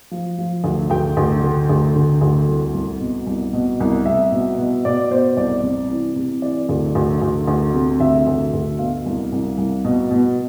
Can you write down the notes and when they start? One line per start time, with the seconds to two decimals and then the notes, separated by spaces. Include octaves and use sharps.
0.11 F3
0.38 F3
0.64 D2
0.90 D2 G5
1.17 D2
1.43 D3
1.69 D2
1.96 D3
2.21 D2
2.48 C2
2.74 C2
3.00 B2
3.27 C2
3.53 B2
3.80 C2
4.06 C2 E5
4.32 B2
4.58 B2
4.85 B2 D5
5.10 B2 C5
5.37 C2 D5
5.63 C3
5.89 E3
6.16 C3
6.42 E3 D5
6.69 D2
6.95 D2
7.22 D2
7.48 D2
7.74 C3
8.00 D2 E5
8.27 D2
8.53 D2
8.79 B2 F5
9.06 C2
9.32 C2
9.58 C2
9.84 B2
10.11 B2